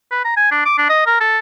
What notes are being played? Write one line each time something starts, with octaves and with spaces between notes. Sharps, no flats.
B4
A#5
G#5
D4
D6
D4
D#5
A#4
A4